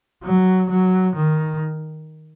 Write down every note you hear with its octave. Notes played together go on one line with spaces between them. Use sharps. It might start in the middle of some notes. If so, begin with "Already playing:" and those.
F#3
F#3
D#3